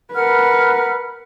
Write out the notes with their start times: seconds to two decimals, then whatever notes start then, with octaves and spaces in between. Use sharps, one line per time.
0.14 A#4 B4 F#5 F6